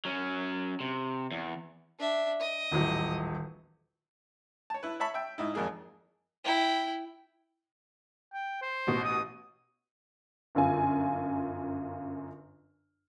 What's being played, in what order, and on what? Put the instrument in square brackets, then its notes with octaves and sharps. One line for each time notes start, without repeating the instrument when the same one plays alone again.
[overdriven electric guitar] F#3 C#4
C3
E2
[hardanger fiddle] D4 E5
D#5
[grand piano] D#1 A1 F#3
[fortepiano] C#5 A5
E4 B4
C#5 E5 A5 B5 C#6
E5 G5
G#2 D#4 E4
G#1 F2 A#3 G#4 D#5
[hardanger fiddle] E4 G5
[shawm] G5
C5
[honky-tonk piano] A1 B2
[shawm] D#6
[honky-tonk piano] G1 F#2 F4 G#5